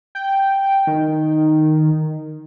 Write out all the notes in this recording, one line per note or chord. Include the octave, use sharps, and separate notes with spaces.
G5
D#3